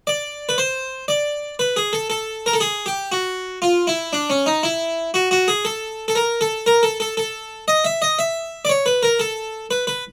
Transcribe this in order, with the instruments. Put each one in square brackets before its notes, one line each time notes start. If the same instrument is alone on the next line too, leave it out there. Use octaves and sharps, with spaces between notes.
[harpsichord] D5
B4
C5
D5
B4
G#4
A4
A4
A#4
A4
G#4
G4
F#4
F4
E4
D4
C#4
D#4
E4
F#4
F#4
G#4
A4
A4
A#4
A4
A#4
A4
A4
A4
D#5
E5
D#5
E5
D5
C#5
B4
A#4
A4
B4
B4